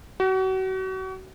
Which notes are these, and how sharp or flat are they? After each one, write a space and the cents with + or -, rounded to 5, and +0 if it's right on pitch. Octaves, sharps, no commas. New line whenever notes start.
F#4 +35